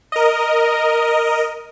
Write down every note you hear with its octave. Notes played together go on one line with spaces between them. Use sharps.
A#4 D#5